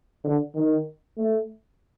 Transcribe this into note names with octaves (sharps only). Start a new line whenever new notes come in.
D3
D#3
A3